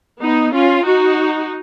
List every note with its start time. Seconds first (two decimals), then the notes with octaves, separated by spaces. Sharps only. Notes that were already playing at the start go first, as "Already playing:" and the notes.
0.22 B3 D#4
0.53 C#4 F4
0.85 D#4 F#4